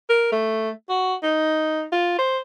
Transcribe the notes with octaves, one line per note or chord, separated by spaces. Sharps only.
A#4
A3
F#4
D#4
F4
C5